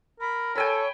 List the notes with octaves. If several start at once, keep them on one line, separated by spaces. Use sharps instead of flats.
A#4 B5
A4 C#5 G5 G#5 B5